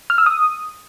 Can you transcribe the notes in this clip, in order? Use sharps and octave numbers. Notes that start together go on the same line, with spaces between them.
F6
E6
D#6